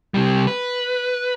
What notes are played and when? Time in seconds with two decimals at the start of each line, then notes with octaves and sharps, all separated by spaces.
0.14 C3 G3
0.47 B4